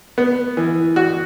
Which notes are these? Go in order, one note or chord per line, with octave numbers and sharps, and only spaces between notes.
B3
E3
F#4